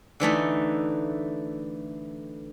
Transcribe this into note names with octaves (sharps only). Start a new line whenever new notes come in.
D3 E3 A3 D#4